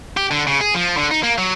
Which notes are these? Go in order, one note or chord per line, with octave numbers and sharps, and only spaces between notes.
G4
D3
C#3
G#4
F3
D3
D#4
A#3
F#3